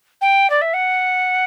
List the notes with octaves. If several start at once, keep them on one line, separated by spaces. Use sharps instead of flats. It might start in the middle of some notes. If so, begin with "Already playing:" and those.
G5
D5
E5
F#5